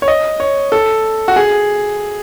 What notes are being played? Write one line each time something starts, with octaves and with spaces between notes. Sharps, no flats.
C#5
D#5
C#5
A4
F#4
G#4